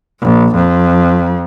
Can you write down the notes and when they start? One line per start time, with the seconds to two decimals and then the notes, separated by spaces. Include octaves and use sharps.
0.21 A#1
0.55 F2